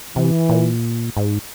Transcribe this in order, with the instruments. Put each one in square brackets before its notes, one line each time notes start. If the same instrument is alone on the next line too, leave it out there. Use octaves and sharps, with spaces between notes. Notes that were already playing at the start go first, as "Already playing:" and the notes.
[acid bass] C3 [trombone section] E3
[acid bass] A#2
G#2